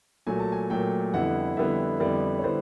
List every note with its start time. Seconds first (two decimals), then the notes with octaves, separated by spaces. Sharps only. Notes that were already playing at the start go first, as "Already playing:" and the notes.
0.26 A#2 F#3 A3 G#5
0.39 A5
0.52 G#5
0.70 A#2 F#3 A3 G5
1.14 F2 D3 G3 B3 E4 F#5
1.57 F2 D3 G3 B3 E4 E5
2.00 F2 D3 G3 B3 E4 D5
2.39 C#5
2.43 D3 G3 B3 E4 C5